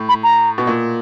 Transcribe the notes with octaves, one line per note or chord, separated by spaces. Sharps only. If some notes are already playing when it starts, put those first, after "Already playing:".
Already playing: A2
B5
A#5
B2
A#2